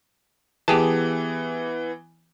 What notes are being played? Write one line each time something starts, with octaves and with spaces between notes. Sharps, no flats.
E3 B3 G4 G#4 A5